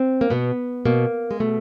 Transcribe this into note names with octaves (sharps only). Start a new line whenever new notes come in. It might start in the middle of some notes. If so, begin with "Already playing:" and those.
Already playing: C4
A#3
B2 B3
B2 A#3
G#3
B2 A3